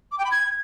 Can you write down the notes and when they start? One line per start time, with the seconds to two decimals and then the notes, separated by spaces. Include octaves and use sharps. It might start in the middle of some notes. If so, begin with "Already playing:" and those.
0.12 D6
0.18 G5
0.25 B5
0.31 G#6